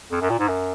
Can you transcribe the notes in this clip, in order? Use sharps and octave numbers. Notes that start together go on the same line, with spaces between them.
F2
F#2
A#2
G#2
F#2